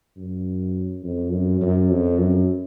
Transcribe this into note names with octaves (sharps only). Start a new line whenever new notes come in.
F#2
F2
F#2
F#2
F2
F#2